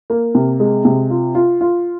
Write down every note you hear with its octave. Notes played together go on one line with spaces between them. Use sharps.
A#3
C3
G#3
C3
F4
F4
F4